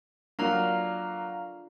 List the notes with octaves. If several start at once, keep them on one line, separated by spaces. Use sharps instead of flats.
F#3 A#3 D4 F4 F5 A#5 F6